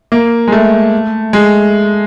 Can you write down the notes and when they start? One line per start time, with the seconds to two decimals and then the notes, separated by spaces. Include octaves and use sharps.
0.12 A#3
0.48 G#3
0.52 A3
1.33 G#3